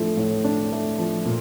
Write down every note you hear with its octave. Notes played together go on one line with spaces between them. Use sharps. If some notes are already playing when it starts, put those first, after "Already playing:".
Already playing: A2 F3 A3 D4
A2
D4
A3
F3
A#2